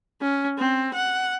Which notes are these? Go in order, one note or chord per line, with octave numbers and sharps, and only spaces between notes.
C#4
C4
F#5